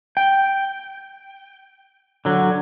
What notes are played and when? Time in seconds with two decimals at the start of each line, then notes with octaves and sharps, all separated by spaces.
0.17 G5
2.25 D3 F#3